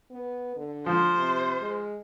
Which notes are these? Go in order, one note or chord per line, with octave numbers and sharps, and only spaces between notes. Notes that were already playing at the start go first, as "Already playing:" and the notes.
B3
D3
F3 C5
C3
G#3